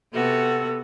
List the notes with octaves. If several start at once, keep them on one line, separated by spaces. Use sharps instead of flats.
C3 B3 F#4 A4